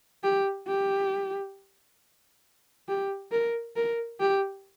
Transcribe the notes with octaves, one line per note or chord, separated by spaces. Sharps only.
G4
G4
G4
A#4
A#4
G4